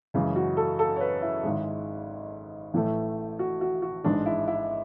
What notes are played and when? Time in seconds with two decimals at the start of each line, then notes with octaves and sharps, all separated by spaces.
0.14 F#2 C#3 E3 G#3
0.36 F#4
0.57 A4
0.79 A4
0.96 C#5
1.00 B4
1.22 E4
1.44 G#1 G#2 G#3
2.74 A1 A2 E3 A3
3.39 F#4
3.61 F#4
3.82 F#4
4.04 A1 G#2 G#3 D4
4.26 E4
4.47 E4